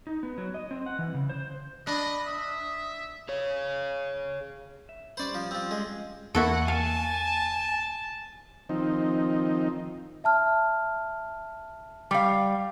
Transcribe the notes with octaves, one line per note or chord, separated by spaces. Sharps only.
D#4
B3
F#3
D#5
C4
F#5
E3
C#3
C5
D4 D#5 B5
E5 D#6
G#4 C#5
E5
G3 C#4 C5 D5 B5
F3
F3 C4
G#3
E2 A#3 E4 F#4 A4 F#5
F5 G#5 A5
D#3 F3 C4 D#4
E5 A5 F6
G3 F5